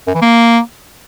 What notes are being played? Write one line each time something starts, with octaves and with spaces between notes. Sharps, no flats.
F#2
E3
A#3